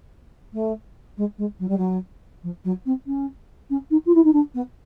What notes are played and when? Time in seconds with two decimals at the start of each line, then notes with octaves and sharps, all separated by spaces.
0.53 A3
1.17 G#3
1.38 G#3
1.59 F#3
1.68 G3
1.77 F#3
2.43 F3
2.64 F#3
2.85 C4
3.06 C#4
3.70 C#4
3.90 D#4
4.05 F4
4.14 E4
4.24 D#4
4.33 D4
4.54 B3